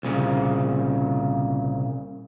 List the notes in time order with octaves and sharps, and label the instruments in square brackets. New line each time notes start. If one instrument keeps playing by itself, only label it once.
[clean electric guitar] C2 A#2 C#3